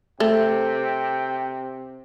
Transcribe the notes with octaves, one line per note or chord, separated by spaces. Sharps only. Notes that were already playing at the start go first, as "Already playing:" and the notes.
C3 A3 G5